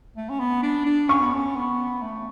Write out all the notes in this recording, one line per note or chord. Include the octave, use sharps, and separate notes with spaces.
A3
C#4
B3
D4
D4
C#4 C#6
B3
C#4
B3
A3